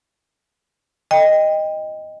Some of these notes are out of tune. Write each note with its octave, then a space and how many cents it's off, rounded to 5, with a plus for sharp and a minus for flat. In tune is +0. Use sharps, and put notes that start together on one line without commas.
D#5 +0 G5 +25